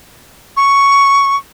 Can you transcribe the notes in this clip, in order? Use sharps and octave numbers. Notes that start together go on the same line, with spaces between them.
C#6